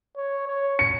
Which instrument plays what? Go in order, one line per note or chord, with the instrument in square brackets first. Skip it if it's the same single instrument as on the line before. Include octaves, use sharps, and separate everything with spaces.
[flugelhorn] C#5
C#5
[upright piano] C#7